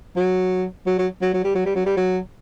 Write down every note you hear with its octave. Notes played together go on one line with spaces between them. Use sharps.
F#3
F#3
F#3
F#3
F#3
G3
F#3
G3
F#3
G3
F#3